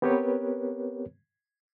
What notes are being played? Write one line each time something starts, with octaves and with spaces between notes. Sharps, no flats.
B3 C4 G4 A#4 B4 C#5